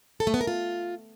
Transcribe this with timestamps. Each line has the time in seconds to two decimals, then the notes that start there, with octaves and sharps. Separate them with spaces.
0.20 A4
0.27 A3
0.34 B3
0.41 A#4
0.47 F4